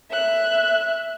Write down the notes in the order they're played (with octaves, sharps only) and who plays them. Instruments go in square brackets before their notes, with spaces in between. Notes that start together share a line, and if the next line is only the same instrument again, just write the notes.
[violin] E5 F#6